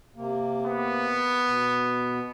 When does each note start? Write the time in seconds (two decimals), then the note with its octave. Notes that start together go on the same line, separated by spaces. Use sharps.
0.16 C3 A#3
0.66 B3
1.46 B2